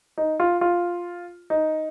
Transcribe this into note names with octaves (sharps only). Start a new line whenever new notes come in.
D#4
F4
F4
D#4